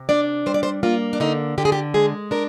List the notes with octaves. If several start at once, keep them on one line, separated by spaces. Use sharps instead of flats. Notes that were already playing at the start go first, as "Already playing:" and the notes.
Already playing: C3
D4 D5
G3 C5
D5
C5
A#3 F4
D4
D3 D#4
D3 G4
G#4
G4
G#3 G#4
D4 A#4